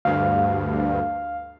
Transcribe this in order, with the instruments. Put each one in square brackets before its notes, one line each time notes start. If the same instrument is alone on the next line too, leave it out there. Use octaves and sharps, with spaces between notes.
[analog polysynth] D2 G2 [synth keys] F5